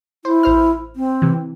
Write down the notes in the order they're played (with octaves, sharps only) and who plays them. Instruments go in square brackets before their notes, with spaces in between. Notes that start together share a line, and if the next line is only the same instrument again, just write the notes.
[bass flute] E4 [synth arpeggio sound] C5
[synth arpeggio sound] A1 C5 F6
[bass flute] C4
[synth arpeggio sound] C3 E3